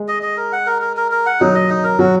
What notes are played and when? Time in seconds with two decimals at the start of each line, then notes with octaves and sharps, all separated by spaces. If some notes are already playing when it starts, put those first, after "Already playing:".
Already playing: G#3
0.08 D#5
0.22 D#5
0.37 A#4
0.52 F#5
0.66 A#4
0.82 A#4
0.97 A#4
1.12 A#4
1.26 F#5
1.40 F#3 D#4
1.55 D#5
1.70 D#4
1.84 A#4
1.99 F#3 F#4